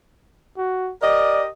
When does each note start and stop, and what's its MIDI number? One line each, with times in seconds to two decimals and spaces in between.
0.57 0.92 66
1.02 1.48 67
1.02 1.48 70
1.02 1.42 74
1.02 1.48 75